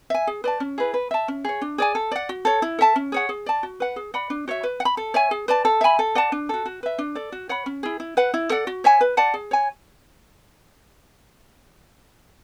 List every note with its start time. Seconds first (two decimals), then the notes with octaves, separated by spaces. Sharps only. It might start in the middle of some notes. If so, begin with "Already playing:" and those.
0.10 E5 G#5
0.27 G#4
0.44 B4 D5 A5
0.60 C#4
0.78 E4 G#4 B4
0.94 B4
1.11 E5 A5
1.28 C#4
1.44 G#4 C#5
1.61 D4
1.78 G#4 D5 G#5
1.95 A4
2.12 D5 F#5
2.29 F#4
2.45 A4 C#5
2.62 E4
2.79 A4 E5 A5
2.96 C#4
3.12 G#4 C#5 F#5
3.29 G#4
3.46 D5 A5
3.63 F#4
3.80 B4 F#5
3.96 G#4
4.14 D5 F#5 B5
4.30 D4
4.48 F#4 C#5 E5
4.63 B4
4.80 F#5
4.85 B5
4.97 A4
5.14 C#5 E5 G#5
5.31 G#4
5.48 B4 D5 A5
5.65 A4
5.81 E5 G#5 B5
5.99 A4
6.15 D5 F#5 A5
6.32 D4
6.49 F#4 A4
6.66 F#4
6.83 B4 E5
6.98 D4
7.15 A4 D5
7.32 F#4
7.49 C#5 F#5 B5
7.66 C#4
7.83 E4 G#4
8.00 E4
8.17 B4 F#5
8.34 E4
8.50 A4 D5 F#5
8.67 F#4
8.84 C#5 E5 G#5
9.01 B4
9.17 D5 F#5 A5
9.34 G#4
9.51 C#5 G#5